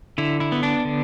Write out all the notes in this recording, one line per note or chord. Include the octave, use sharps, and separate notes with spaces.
D3 E4
E4
B3
D4
D3